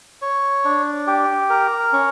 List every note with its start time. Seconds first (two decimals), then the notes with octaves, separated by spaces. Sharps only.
0.22 C#5
0.65 D4
1.07 G4
1.50 A#4
1.93 C#4